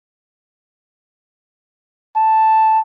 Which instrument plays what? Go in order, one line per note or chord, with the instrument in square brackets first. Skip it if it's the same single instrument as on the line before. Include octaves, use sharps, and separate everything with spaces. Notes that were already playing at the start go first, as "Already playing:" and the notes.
[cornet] A5